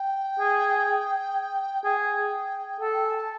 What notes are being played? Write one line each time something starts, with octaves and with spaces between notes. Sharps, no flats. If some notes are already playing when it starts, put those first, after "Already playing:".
Already playing: G5
G#4
G#4 G5
F#5
G5
A4 F#5
G5
G#5
A5